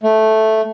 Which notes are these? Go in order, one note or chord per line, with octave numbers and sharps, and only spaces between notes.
A3